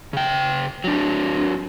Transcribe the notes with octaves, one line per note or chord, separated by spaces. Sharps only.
C#3 G5
F#3 D4